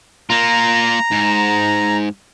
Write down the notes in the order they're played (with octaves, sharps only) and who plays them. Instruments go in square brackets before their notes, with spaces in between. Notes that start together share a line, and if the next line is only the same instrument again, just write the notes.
[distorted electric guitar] A#3 F4 [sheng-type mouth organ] A#5
[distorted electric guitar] G#2